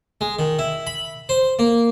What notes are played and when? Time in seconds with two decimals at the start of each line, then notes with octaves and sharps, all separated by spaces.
0.21 G#3
0.39 D#3
0.59 E4
0.87 B5
1.29 C5
1.59 A#3